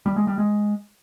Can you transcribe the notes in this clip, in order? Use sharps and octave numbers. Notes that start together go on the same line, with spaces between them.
G3
G#3
G3
G#3